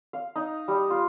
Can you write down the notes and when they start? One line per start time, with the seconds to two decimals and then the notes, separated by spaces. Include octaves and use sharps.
0.13 F5
0.36 D#4
0.68 G3
0.90 F4